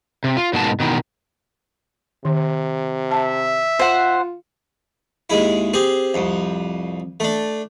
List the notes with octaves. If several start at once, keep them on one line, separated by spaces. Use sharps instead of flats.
C3
F4
G#2 B2 A#3 F#4 G#5 A5
B2 D#3 E3
C3 D#3
E5 A5
F4 C5 F#5
D#2 G#3 E4
C4 G4 G#4
C2 F2
A3 D4